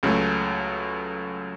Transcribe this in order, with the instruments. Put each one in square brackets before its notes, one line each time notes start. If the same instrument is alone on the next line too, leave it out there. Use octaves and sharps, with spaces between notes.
[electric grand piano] C#2 C#3 F#3 A3